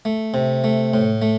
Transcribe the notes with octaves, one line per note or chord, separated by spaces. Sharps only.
A3
C3
A3
A2
A3